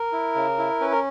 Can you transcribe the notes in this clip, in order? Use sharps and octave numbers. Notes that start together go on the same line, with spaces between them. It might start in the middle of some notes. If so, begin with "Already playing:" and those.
Already playing: A#4
E4
C#3
E4
C#4 B4
A#4